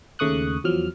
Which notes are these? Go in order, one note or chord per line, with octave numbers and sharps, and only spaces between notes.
D#2 C#3 A3 C#6 D#6 F#6
E2 F3 F#3 F6